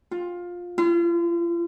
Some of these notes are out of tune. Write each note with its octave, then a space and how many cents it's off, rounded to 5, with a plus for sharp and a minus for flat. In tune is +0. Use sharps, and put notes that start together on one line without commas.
F4 +15
F4 -40